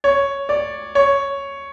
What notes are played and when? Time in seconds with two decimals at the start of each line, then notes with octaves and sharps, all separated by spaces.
0.04 C#5
0.49 D5
0.95 C#5